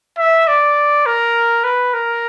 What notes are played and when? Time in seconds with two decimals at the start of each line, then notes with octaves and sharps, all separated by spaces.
0.18 E5
0.48 D5
1.06 A#4
1.64 B4
1.94 A#4